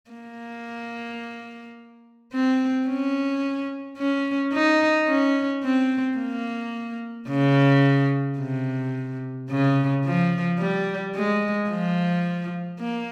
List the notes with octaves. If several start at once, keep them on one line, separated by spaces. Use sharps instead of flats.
A#3
C4
C#4
C#4
D#4
C#4
C4
A#3
C#3
C3
C#3
F3
G3
G#3
F3
A#3